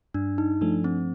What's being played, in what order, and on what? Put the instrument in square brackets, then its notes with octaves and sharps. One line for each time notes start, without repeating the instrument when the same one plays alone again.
[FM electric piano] G2 [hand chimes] D4
[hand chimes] D#4
[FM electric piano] F3 A3 [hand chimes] D4
[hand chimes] C4